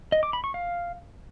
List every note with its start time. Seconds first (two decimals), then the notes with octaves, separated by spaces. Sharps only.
0.12 D#5
0.23 D6
0.33 B5
0.44 C#6
0.54 F5